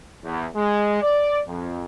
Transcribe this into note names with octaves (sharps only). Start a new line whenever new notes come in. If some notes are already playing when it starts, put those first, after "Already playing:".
E2
G#3
D5
F2